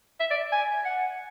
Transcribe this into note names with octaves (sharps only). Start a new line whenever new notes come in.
E5
D5
G#5
F#5